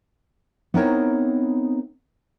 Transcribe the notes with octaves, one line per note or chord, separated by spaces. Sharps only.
B3 C4 D#4 E4 A#4 C#5